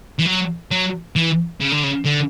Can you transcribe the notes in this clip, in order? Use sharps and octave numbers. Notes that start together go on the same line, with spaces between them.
E3
F#3
F#3
E3
C#3
D3
C#3
D3